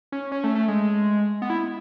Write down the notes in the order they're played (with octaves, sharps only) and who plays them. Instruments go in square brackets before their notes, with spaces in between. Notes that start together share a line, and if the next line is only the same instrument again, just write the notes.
[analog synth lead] C#4
C#4
A3
A3
G#3
B3
E4